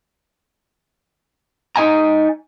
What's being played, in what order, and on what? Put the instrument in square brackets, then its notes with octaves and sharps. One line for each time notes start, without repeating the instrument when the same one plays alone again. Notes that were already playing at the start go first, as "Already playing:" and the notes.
[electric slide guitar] D#4 D#5 G#5 A#5